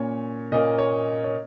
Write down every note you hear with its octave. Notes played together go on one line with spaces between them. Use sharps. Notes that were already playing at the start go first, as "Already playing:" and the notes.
Already playing: A#2 A#3 C#4 C#5
A#2 A#3 C#4 D#5
C#5
C#5